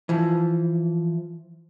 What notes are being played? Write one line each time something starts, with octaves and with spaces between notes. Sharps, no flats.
E3 F3